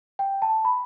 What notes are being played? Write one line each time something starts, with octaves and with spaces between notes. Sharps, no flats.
G5
A5
B5